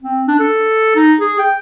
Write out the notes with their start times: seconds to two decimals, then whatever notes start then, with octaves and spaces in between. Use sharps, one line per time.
0.03 C4
0.27 D4
0.39 A4
0.96 D#4
1.20 G#4
1.39 G5